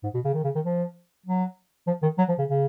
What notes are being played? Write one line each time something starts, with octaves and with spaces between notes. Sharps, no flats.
G#2
B2
C#3
D#3
C#3
D#3
F3
F#3
F3
D#3
F#3
F3
C#3
C#3